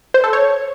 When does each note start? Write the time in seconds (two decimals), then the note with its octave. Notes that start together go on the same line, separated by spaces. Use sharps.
0.14 C5
0.24 A4
0.33 C#5